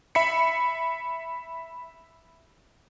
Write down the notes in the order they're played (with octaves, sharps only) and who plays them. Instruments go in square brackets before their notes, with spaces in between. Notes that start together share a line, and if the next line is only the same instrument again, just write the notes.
[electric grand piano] E5 B5 B6 C#7